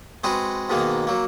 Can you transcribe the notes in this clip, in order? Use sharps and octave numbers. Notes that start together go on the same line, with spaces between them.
G#3 C4 F#4 G#4 B4
G#2 B2 D#3 G#3 A#3
F#3 A#3